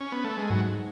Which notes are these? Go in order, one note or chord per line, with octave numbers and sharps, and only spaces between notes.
C#4
B3
A3
G#3
G#2 F#3